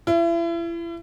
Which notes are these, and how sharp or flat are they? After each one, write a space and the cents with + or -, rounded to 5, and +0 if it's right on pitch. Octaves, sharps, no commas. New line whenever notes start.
E4 +35